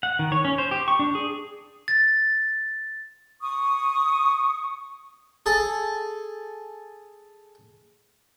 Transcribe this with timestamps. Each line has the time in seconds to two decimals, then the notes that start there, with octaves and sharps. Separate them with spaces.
0.03 F#5
0.19 D#3
0.32 C#5
0.45 C#4
0.58 C5
0.71 G4
0.88 C#6
0.99 D4
1.15 G#4
1.88 A6
3.41 C#6 D#6
5.46 G#4 A4 A5